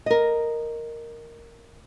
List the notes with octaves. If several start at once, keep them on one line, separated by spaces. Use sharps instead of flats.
A#4 D#5